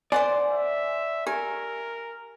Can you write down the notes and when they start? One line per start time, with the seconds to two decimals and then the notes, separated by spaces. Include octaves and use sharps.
0.12 C5 D5 F#5 G#5 C6
0.53 E5
1.27 G4 A#4 G#5